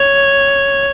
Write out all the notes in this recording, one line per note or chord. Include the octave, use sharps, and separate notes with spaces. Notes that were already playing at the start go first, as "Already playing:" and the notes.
Already playing: C#5